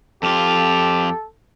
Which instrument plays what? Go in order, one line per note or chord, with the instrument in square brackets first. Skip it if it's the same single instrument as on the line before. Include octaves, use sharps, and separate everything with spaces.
[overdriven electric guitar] F2 F4 [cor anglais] G4 [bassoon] A4